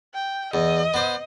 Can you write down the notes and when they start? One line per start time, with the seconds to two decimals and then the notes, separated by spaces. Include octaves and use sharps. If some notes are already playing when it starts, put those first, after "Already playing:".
0.14 G5
0.54 E2 D#5
0.94 B3 C5